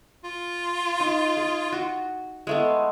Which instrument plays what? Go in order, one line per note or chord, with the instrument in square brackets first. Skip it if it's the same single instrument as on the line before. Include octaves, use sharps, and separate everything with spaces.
[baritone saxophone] F4
[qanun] D#4
G#4
F#4
G#3 A3 B3